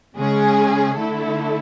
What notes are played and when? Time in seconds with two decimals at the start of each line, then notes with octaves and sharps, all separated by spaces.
0.16 C#3 G#3 C#4 G#4
0.97 D3 A3 E4 A4